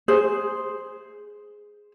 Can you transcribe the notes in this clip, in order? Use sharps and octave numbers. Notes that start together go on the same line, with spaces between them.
G#4 C5